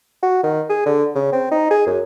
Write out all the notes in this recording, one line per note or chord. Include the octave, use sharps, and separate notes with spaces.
F#4
D#3
G#4
D3
C#3
C4
D#4
G#4
F#2